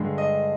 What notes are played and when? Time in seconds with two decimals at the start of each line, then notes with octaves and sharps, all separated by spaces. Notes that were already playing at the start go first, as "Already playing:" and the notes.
Already playing: G2 D3 G#3
0.18 D#5